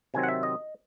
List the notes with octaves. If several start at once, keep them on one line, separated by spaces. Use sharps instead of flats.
C3 D#3 F#3 C4 G#5
F#5
E5
D#5